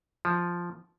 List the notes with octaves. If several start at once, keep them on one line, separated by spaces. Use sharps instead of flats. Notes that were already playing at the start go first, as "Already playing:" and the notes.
F3